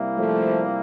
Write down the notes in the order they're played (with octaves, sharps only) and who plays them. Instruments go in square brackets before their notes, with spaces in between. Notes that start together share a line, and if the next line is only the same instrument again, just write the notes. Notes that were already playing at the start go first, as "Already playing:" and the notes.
Already playing: [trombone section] C3 G3 A#3 E4
[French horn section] F3 A3